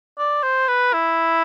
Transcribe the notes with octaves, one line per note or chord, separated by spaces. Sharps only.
D5
C5
B4
E4